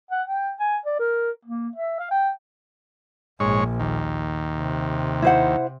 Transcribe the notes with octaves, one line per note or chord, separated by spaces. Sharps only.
F#5
G5
G#5
D5
A#4
A#3
E5
F5
G5
A#1 G#2 C#5
D#2
C3
E4 C5 F#5